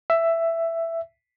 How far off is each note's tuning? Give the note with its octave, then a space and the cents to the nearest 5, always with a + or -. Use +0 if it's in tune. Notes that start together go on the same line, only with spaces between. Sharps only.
E5 +10